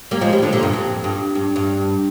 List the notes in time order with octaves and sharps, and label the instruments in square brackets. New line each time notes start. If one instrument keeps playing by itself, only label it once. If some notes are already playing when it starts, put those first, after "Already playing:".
[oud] G3 A#3
F3 G#3
D#3 G3
D3 F3
A#2 D3
G2
F2
G2
G2
G2